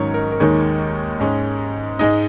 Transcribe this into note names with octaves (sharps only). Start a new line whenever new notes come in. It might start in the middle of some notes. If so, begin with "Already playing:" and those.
Already playing: G#2 D#3 F#3 C#4 C#5
A#4
A#4
D#2 D#3 G#3 D#4 C#5
G#2 G#3 C#4
G#2 G#3 D#4 D#5